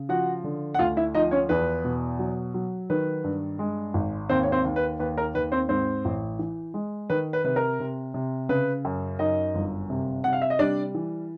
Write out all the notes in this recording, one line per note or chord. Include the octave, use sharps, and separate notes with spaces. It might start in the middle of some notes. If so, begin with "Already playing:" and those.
Already playing: C#3
F3 F#4 F#5
D3
F#5
D2 F4 F5
E4 E5
F3 D#4 D#5
C#4 C#5
E2 B4
B2
F#3
F#3
D#3 B4
G2
G#3
G#1
D#2 C4 C5
C#5
C4 C5
D#2
B4
D#2 B4
A#4
D#2 B4
C4 C5
G#2 C4 C5
A1
E3
G#3
D#3 B4
B4
C3 B4
A#4
C3
C3
C#3 B4
F#2
F#2 D#4 D#5
G1
C3
C3 F#5
F5
E5
D#5
G3 D4 D5
E3